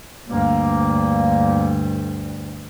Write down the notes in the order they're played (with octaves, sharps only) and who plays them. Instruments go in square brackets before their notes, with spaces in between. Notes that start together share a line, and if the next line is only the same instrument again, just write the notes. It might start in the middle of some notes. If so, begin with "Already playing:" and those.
[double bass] D2 G2 [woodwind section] A#3